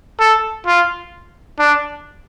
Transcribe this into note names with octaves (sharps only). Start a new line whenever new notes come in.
A4
F4
D4